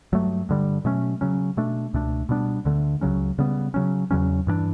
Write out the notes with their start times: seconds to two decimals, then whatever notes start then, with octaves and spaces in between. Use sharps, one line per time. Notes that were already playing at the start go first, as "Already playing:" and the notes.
0.13 G2 F#3 A3
0.49 G2 D3 G3
0.85 B2 F#3 A3 C#4
1.21 C#3 F#3 C#4
1.57 B2 A3 D4
1.94 C#2 B2 A3 D4
2.29 B2 G3 B3 D4
2.65 D2 D3 A3
3.01 C#2 C#3 F#3 C#4
3.38 C#3 G3 B3
3.74 C#3 F#3 C#4
4.11 E2 C#3 F#3 C#4
4.47 G2 E3 B3 D4